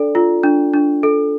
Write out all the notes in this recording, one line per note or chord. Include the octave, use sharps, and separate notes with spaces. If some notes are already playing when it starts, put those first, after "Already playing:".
Already playing: D4 A4 D5
F4
D4
D4
A4